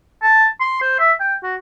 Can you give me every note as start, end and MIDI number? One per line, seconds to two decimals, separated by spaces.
0.23 0.47 81
0.61 0.78 84
0.82 0.96 72
1.00 1.13 76
1.20 1.35 79
1.43 1.56 66